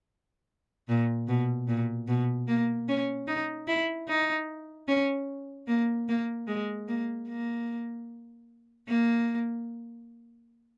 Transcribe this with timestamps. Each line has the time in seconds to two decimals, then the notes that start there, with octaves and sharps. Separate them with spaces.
0.88 A#2
1.28 B2
1.68 A#2
2.08 B2
2.48 A#3
2.88 C#4
3.27 D#4
3.67 E4
4.08 D#4
4.88 C#4
5.67 A#3
6.08 A#3
6.47 G#3
6.88 A#3
7.28 A#3
8.88 A#3